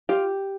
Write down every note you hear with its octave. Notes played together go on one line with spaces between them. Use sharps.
F4 G4